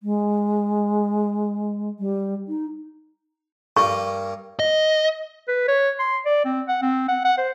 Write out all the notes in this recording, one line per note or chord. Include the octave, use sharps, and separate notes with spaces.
G#3
G3
D#4
G2 A#3 C#6
D#5
B4
C#5
C6
D5
C4
F#5
C4
F#5
F#5
C5